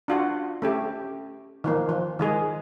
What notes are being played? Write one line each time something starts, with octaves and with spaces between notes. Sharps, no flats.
D4 F4 F#4
A3 C#4 G4
D#3 F3 A#3
F3
D#3 G#3 G#4